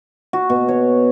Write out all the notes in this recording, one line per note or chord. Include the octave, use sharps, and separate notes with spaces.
F#4
B2
C#5